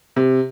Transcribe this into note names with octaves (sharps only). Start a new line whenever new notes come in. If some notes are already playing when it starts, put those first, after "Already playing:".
C3